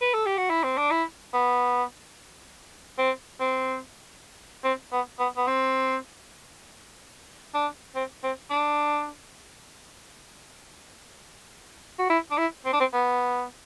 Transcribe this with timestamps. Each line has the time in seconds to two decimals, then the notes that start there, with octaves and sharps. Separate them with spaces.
0.01 B4
0.14 A4
0.26 G4
0.37 F#4
0.50 E4
0.64 C4
0.77 D4
0.91 E4
1.33 B3
2.98 C4
3.40 C4
4.64 C4
4.92 B3
5.19 B3
5.37 B3
5.47 C4
7.54 D4
7.96 C4
8.24 C4
8.50 D4
11.99 F#4
12.10 E4
12.31 D4
12.38 E4
12.66 C4
12.73 D4
12.80 C4
12.93 B3